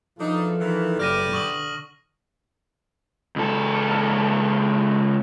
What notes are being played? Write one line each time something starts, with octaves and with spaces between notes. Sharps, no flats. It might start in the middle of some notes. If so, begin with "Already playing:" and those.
E2 F3 D4 D#4 A4
D#3 E3
F#1 G4 B4 D5 F6 A#6 D#7
D3 C#6 D#6 F#7
C#2 A4